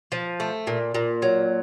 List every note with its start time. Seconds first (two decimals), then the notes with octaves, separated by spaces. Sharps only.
0.12 F3
0.40 A3
0.67 A#2
0.95 A#2
1.22 F#3